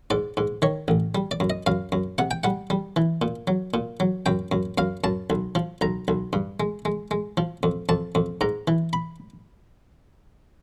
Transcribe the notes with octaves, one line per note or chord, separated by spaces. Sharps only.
G#2 D5
G#2
D#3 C#5
A1
G3
D5
F#2
D#5
F#2 F5
F#2
C3 F#5
G5
G3 F#5
G3
E3
A#2
F#3
A#2
F#3
F#2 G5
F#2
F#2 F5
F#2 A5
B1
F3
B1 A#5
B1
G2
G#3
G#3
G#3
F3
F2
F2 A5
F2
G#2 A#5
E3
B5